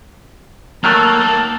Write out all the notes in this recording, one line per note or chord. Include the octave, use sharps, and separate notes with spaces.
D#3 F#3 A3 A#3 A5